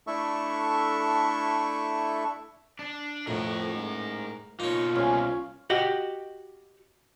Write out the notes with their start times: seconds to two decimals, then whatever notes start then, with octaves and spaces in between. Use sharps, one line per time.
0.07 A3 D4 E4 A4 E5 C#6
2.79 D4
3.27 F2 A2 A#4 F#5
3.73 G#2
4.60 B2 A#3 D#4 F4 C#5
4.96 C2 C#4 F5 G#5
5.70 F#4 G4 D#5